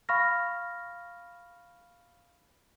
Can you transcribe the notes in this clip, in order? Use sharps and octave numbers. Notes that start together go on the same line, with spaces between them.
F5 B5 C#6 F6 A#6